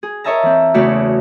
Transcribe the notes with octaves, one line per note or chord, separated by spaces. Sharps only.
G#4
A#4 C#5 D#5 E5 A5 A#5
E3 C4
E2 C#3 A3 F#4 B4 D5